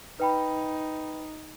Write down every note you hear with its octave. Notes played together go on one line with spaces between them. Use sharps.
D#4 B4 G5 B5